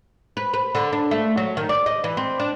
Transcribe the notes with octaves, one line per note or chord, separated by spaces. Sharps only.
B4
B4
D3
D4
A3
F#3
D#3
D5
D#5
E3
C4
D4